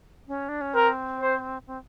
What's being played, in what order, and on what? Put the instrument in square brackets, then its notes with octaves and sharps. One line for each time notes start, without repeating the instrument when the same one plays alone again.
[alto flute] C#4
D4
C#4
[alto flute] C4 [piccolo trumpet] A#4
[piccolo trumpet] C5
[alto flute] C4